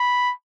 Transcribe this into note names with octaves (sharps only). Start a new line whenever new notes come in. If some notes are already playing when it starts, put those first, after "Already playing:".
Already playing: B5